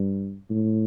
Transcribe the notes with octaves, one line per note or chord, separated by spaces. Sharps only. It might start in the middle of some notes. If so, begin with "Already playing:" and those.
Already playing: G2
A2